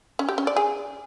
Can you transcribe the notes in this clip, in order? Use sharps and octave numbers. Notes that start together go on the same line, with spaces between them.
C#4
G4
C#4
D5
G#4